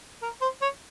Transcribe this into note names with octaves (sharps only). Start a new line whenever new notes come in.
A#4
C5
C#5